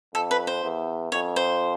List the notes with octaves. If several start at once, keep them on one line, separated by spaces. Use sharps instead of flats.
F2 A4
B4
C5
E2
F2 C#5
C5